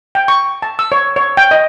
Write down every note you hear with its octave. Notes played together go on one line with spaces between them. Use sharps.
G5
C#6
A5
E6
C#5
C#5
G5
D#5